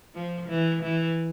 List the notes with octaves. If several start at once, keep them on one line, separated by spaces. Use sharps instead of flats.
F3
E3
E3